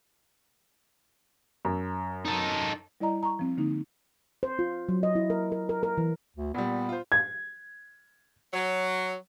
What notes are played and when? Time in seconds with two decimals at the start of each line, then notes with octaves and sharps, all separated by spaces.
1.65 F#2
2.25 D#4 A4
3.00 G3 E4 D5 D#5 A#5
3.23 A#5 C#6
3.39 F3 C4
3.57 D3 A#3 D#4
4.43 C5
4.59 F4
4.89 F#3
5.03 D#5
5.15 E4
5.30 A#4
5.52 A#4
5.69 A#4
5.83 A#4
5.98 E3
6.36 D2
6.54 A#2 G3 B3
6.89 F4 C5
7.12 G#6
8.53 F#3